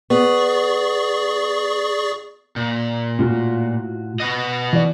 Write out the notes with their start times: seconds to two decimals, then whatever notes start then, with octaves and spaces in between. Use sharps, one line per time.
0.10 B3 G#4 D5 C#6
2.56 A#2
3.19 A2 F4 F#4
4.20 B3 F#4 D#5
4.73 E3 D5